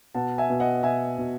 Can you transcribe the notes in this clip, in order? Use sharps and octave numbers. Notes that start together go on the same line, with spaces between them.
B2 F#5 A5
E5 G#5
B2
D#5 F#5
B2 E5 G#5
B2